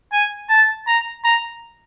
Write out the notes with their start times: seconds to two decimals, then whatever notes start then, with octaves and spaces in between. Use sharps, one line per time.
0.12 G#5
0.49 A5
0.87 A#5
1.24 A#5